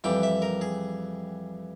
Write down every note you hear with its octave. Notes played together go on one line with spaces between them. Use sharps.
F2 E3 G3 G5
E5
A#4
G#4